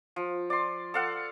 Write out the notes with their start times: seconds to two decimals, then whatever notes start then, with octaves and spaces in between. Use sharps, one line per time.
0.16 F3
0.50 D5 C6
0.94 A4 F5 F#5